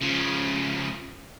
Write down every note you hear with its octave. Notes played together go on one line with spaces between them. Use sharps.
C#3 F3